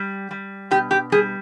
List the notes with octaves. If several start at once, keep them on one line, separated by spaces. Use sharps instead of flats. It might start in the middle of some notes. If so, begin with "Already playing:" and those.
Already playing: G3
G3
B2 G4
G4
G3 G#4